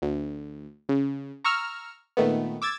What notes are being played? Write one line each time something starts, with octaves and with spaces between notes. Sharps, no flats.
D2
C#3
A#5 C#6 E6 F6
A#2 D#3 A3 B3
D6 E6 G#6 A6